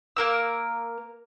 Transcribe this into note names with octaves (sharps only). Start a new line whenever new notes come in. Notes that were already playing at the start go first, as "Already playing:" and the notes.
A#3 A#4 E6